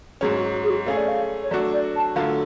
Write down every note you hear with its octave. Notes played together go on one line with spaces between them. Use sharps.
G#2 F#3 C#4 G#4
F#4
G#4
F#4
A3 C#4 G#4 F5
D5
F5
C#5
F#3 A3 D4 F#4 D5
D5
A5
D3 F#3 A3 F4 F5